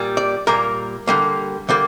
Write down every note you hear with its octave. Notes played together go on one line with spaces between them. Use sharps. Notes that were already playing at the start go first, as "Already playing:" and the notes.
Already playing: A#2 G3 A#3
D5
A#2 G3 A#3 A#4
D3 G3 A#3
D3 G3 A#3